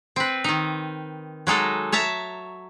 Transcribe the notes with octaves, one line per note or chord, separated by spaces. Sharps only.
C4 B4
D#3 D#4
F#3 G#3 D#4 A4
C#5 E5 A5 A#5